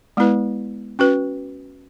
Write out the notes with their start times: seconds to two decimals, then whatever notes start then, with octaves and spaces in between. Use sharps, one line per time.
0.17 G#3 B3 E4 B4
0.99 C#4 F#4 B4